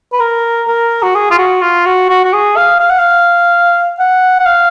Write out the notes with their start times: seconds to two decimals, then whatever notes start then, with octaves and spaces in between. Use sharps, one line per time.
0.13 B4
0.20 A#4
0.68 A#4
1.03 F#4
1.15 G#4
1.31 F4
1.38 F#4
1.62 F4
1.86 F#4
2.09 F#4
2.24 F#4
2.33 G#4
2.57 F5
2.80 F5
2.90 F#5
2.99 F5
3.99 F#5
4.40 F#5
4.46 F5